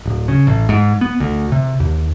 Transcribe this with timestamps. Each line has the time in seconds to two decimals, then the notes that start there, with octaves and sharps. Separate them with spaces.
0.05 D1
0.28 C#3
0.47 A1
0.69 G#2
1.01 B3
1.20 D2
1.52 C3
1.80 D#2